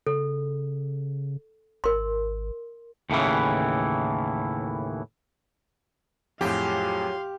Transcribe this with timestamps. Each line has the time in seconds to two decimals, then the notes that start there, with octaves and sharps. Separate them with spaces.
0.07 C#3 A4
1.84 G#1 A#4 C6
3.10 D#2 A2 C#3 E3
6.41 F2 A2 F#3 F4 G4 G#4 F5 C6